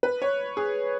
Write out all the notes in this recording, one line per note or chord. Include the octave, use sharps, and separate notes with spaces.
B4
C#5
G#4